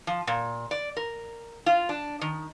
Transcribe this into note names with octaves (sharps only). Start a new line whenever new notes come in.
F3
A#2
D5
A#4
F4
D4
D#3